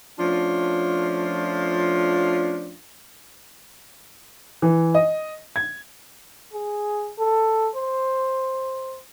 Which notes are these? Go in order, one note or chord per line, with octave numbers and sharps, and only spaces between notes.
F3 A3 C#4 D4 F4
E3
D#5
G#6
G#4
A4
C5